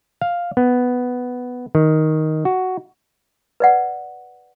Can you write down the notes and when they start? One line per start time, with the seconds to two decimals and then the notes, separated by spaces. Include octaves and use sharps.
0.21 F5
0.57 B3
1.75 D#3
2.45 F#4
3.60 B4 D5 F#5